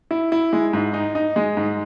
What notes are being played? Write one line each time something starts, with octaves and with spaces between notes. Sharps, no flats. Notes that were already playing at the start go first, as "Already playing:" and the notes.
E4
E4
G#3
G#2
D#4
D#4
G#3
G#2